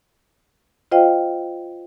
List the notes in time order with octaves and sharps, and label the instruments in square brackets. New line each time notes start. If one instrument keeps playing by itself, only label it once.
[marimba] F4 C5 D#5 F5 G5